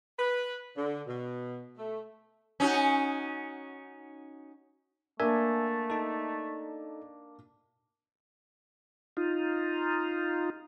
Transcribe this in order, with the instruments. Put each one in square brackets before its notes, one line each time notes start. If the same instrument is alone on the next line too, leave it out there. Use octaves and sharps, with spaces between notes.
[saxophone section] B4
D3
B2
A3
[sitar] C#4 D#4 F#4
[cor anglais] A3 [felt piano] A#3 D4 [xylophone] A#4 [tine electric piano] E5 G#5
[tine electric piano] D#4 A4
[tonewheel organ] D#4 F4